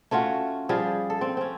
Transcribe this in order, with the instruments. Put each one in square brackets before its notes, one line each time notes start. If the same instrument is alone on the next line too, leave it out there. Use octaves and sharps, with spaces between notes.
[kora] A3 C#4 F4 F#4
F3 G3 G#4 F5
A4
C4
C4 C#4